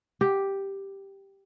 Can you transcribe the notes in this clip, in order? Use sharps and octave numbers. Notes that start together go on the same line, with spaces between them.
G4